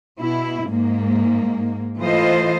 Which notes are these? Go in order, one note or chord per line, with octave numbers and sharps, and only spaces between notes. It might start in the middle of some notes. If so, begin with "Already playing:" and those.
B2 E4
G#2 A#3
E3 A3 F4 C5 D#5